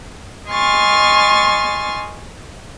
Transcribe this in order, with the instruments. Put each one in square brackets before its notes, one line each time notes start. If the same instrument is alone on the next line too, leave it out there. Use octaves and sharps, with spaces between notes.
[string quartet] D#5 G#5 C6 C#6 F6 A6